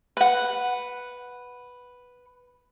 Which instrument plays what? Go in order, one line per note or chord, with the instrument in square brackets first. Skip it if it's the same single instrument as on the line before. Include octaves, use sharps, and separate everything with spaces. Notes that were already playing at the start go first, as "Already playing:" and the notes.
[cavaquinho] B4 F#5